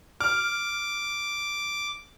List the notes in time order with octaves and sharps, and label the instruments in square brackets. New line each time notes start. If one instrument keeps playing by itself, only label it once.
[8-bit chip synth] D6 [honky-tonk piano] F6